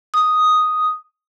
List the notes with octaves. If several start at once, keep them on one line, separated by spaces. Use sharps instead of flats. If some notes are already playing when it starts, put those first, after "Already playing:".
D#6